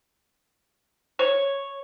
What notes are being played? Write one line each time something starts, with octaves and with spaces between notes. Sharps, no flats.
C#5